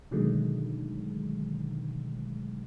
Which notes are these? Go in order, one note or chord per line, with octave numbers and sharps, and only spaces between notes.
B2 D3 D#3 F#3 G#3 A3